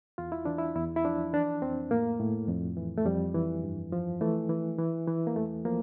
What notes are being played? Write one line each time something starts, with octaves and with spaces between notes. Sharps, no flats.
E2 F4
E4
E3 D4
E4
E2 E4
E4
F3 D4
E3 D4
F2 C4
A2 A#3
A2
F2
E3
A3
F2 G3
E3
G2
F3
E3 A3
E3
E3
E3
A#3
E2 A3
F3 A#3